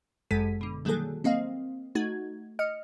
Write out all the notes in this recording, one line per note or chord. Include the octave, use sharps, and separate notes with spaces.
G1 F#2 G#3 A4 B6 D#7
B2 D3
D#3 F#3 G3 A#3 G#4 A4
A#3 C4 D#5 F5
A3 D#4 F#4 G#6
D#5 F6 C#7